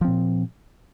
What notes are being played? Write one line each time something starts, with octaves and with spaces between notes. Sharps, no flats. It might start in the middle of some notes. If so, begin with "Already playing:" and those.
A#2 F3 C4